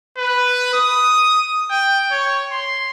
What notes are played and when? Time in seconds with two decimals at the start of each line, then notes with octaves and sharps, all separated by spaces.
0.18 B4
0.74 D#6
1.71 G5
2.11 C#5
2.52 C6